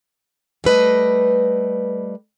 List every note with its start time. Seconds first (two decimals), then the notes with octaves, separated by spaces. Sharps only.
0.64 G3 A3 B4 D#5